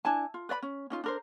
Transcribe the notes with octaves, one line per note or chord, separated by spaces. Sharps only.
D4 E4 G#5 A5
F4
B4 D5 E5 B5
C#4
C#4 D#4 F4
D4 A#4 C5